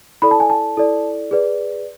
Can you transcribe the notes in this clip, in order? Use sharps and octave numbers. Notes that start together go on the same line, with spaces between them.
E4 A4 D5 B5
A5
G#5
A5
E4 A4 D5
G#4 B4 D5